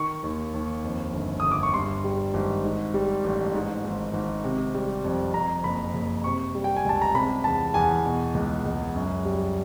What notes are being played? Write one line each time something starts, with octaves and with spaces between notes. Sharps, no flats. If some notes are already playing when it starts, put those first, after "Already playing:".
Already playing: D#3 C#6
D#2
D#2
F2
G1
G1 D#6
D6
C#6
G2 C6
G3
G#1
G#2
G3
A1
G#2
G#1
G#1
C3
G3
F2
F2 A#5
F#1 B5
F#1
C3 C#6
G3
G5
G#5
C#2 A5
A#5
C3 B5
E2 A5
E2 G#5
B2
C#2
C#2
F#2
G3